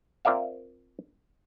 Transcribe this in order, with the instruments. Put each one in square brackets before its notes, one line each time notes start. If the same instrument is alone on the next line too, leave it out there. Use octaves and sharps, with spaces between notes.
[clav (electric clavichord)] C4 F4 A#4 D5 E5 F5